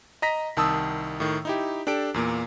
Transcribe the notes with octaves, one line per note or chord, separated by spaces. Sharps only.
D#5 A#5 A#6 B6
C2 D#3 A5 D#6 E6
A2 D#3
D#4 E4 G4
D4 G4 A4 D7
E2 A#2 A#3